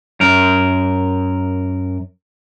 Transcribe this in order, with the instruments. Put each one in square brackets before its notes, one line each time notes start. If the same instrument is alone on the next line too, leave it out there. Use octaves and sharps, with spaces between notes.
[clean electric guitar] F#2 A#4